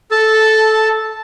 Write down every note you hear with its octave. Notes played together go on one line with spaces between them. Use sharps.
A4 A5